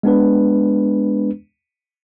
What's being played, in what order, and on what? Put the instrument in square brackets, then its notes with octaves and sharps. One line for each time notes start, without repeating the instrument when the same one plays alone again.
[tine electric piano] G#3 B3 D4 B4